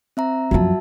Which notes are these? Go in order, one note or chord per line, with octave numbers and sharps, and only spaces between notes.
C4 E5 A#5
F#2 F3 F#4 E5 A5